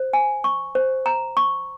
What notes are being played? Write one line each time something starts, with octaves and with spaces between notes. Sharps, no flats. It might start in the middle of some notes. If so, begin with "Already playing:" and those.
Already playing: C5
G#5
C#6
C5
A#5
C#6